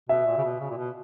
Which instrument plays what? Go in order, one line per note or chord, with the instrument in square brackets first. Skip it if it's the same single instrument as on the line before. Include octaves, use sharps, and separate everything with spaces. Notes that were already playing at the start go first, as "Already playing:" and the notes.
[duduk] B2 [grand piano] E5
[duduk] A#2
C#3
B2
C#3
A#2
B2